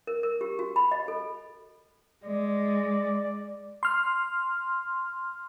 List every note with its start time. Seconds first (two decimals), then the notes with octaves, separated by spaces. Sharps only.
0.07 A#4
0.23 A#4
0.41 G4
0.59 F#4
0.76 B5
0.91 D#5
1.08 A4
2.25 G#3 D5
3.83 C6 F6